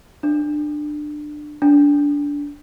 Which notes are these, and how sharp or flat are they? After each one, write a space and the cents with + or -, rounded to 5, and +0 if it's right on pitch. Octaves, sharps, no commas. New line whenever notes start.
D4 +20
D4 -20